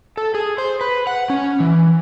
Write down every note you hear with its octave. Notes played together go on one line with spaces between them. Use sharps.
A4
G#4
C5
B4
F#5
C#4
E3